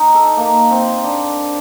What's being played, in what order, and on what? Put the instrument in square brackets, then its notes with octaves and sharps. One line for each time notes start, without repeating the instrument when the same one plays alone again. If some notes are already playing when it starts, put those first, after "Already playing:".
Already playing: [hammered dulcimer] D#4
A4
A#3
C4
D4